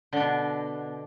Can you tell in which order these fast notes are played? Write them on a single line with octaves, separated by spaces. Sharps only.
D3 D4 B2